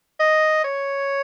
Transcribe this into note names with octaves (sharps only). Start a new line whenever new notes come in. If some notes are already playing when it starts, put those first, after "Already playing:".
D#5
C#5